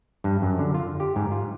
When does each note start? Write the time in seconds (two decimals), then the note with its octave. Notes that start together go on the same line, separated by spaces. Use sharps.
0.24 G2
0.42 F#2
0.59 D3
0.74 F4
1.00 G4
1.16 G#2
1.32 F4